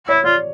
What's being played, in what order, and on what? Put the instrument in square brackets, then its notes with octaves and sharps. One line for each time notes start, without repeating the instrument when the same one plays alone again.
[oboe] E4 [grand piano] C#5
[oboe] F4 [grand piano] D5